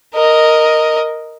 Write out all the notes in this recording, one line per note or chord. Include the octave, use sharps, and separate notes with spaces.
A#4 D#5